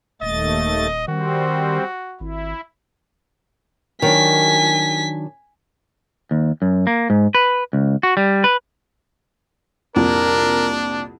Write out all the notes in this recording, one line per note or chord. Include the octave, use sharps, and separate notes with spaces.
D#1 D#2 A3 D#5 A6
D#3 G3 C4 F#4
G#1 E4
D#3 F#3 D4 G#5 B6
D#2
F#2
A#3
G#2
B4
C#2
F#4
G3
B4
C2 F2 A#2 D4 A#4